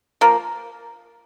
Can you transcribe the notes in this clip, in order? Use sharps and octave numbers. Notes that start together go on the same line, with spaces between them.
F3 A#3